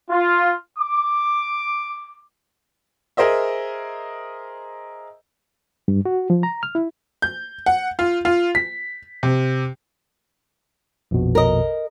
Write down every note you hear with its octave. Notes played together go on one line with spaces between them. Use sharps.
F4
D6
G#4 A#4 C5 D#5 E5
G2
F#4
F3
A#5
F6
E4
G6
F#5
F4
F4
B6
C3
A#1 F2 B2
A#4 D#5